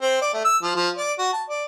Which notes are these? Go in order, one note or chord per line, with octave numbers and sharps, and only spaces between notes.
C4
D5
A3
E6
F3
F3
D5
F#4
A5
D5